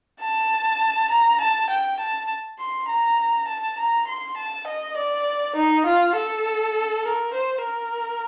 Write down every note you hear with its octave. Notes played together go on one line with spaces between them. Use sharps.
A5
A#5
A5
G5
A5
C6
A#5
A5
A#5
C6
A5
D#5
D5
D#4
F4
A4
A#4
C5
A#4